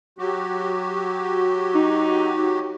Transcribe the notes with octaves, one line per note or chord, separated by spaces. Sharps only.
F#3 F#4 G4
D#4